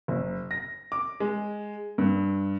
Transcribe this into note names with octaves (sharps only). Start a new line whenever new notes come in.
F#1
A#6
D6
G#3
G2